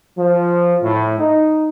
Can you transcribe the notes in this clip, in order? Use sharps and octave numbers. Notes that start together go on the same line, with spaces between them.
F3
A2
D#4